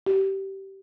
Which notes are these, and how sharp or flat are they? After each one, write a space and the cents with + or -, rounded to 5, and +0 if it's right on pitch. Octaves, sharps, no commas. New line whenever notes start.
G4 -20